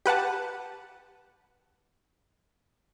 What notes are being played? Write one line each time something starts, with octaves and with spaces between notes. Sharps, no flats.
G4 B4 F#5 A5